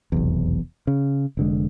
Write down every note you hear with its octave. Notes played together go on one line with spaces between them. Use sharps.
F1 B1 E2
C#3
F1 D3 G#3